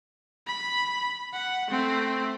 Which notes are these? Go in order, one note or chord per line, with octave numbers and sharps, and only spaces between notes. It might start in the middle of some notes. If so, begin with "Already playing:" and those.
B5
F#5
A3 C4